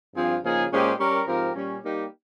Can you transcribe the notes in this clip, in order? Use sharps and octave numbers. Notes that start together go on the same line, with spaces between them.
G2 F3 C4 F4 G#4
C#3 F3 A#3 D#4 G#4
A#2 G#3 C#4 G4 C5
G3 C#4 G4 A#4
G#2 F3 C4 G4 A#4
A#2 G3 C#4
G3 A#3 D#4 G4